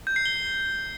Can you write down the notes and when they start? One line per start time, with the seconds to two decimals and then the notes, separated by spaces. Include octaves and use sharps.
0.07 G6
0.16 C7
0.25 G7